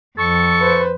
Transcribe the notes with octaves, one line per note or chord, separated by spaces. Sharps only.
F2 A4 C#6
B4 C5